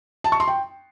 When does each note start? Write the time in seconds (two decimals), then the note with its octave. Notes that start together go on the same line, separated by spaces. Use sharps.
0.24 A5
0.32 C#6
0.40 C6
0.48 G5